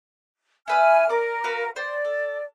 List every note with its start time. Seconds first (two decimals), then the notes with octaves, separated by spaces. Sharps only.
0.68 E4 B4 D5 G#5 F6
1.09 A#4 D5 D6
1.44 F#4 B4 F5
1.76 C5 D5 G5
2.05 A4